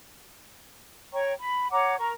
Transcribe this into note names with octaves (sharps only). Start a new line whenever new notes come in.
C#5 G5 A#5 C#6
B5
C#5 F#5 A#5 D6
A#4 A#5 C#6